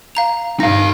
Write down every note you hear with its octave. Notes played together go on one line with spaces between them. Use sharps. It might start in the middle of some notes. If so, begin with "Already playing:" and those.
F5 A#5 F7
G2 D#4 F5 A#6